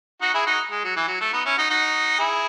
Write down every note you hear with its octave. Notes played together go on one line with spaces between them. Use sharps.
D#4 F#4
E4 G#4
D#4 F#4
G#3
F#3
E3
F#3
A3
B3 D#4
C#4 E4
D#4 F#4
D#4 F#4
E4 G#4